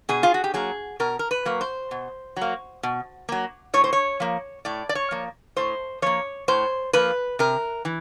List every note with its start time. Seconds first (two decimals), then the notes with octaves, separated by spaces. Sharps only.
0.09 B2 G#4
0.23 F4
0.34 F#4
0.44 G4
0.54 F#3 A#3 G#4
1.00 B2 A#4
1.19 A#4
1.31 B4
1.45 F#3 A#3
1.61 C5
1.91 B2
2.37 F#3 A#3
2.83 B2
3.29 F#3 A#3
3.74 A2 C#5
3.84 C5
3.93 C#5
4.20 F3 A#3
4.65 A2 D5
4.89 D5
4.95 C#5
5.11 F3 A#3
5.57 A2 C5
6.02 F3 A#3 C#5
6.48 A2 C5
6.93 F3 A#3 B4
7.39 C3 A#4
7.85 E3